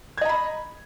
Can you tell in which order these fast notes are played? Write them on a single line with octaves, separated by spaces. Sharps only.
G#6 D#5 A#5 B5